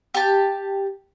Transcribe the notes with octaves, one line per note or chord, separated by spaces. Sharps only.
G4 A5